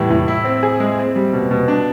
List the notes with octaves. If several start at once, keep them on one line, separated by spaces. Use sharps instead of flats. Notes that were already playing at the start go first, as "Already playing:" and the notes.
Already playing: A2 E3 G3
A2
E4
C4
G#4
G#3
C4
G3
B2
B2
D4